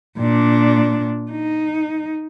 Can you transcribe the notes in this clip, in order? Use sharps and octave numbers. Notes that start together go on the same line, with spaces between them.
A#2 D4
D#4